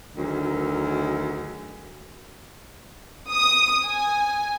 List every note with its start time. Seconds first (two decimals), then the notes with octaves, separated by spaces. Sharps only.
0.16 D2 D#3 F#3 G#4 A#4
3.31 D#6
3.86 G#5